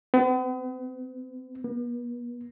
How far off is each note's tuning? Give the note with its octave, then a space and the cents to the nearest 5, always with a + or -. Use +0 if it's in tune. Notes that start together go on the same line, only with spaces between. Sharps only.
B3 +45
B3 -40